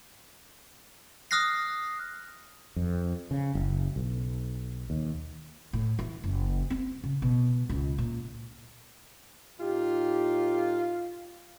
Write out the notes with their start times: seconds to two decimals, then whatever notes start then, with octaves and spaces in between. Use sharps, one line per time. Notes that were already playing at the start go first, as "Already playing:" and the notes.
1.31 D#6 F6 F#6 A#6 C7
2.76 F2
3.31 C#3
3.55 F#1
3.96 B1
4.90 D#2
5.73 A2
5.99 E3
6.24 F#1
6.70 C4
7.04 C#3
7.22 B2
7.69 C#2
7.98 A#2
9.60 A2 D#4 F4 G4